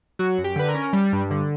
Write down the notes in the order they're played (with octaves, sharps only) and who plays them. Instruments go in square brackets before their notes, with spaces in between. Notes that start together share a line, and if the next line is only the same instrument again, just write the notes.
[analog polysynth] F#3 F#4
F#2
G4
D3 B4
A#4
C#4
G3
G2
D3